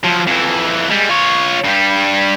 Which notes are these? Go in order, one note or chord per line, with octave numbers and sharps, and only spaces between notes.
F3 F#3
F2 E3
G3 G#3
F4 C#5
G2 G3